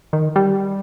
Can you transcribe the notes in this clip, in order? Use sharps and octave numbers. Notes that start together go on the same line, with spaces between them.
D#3
G3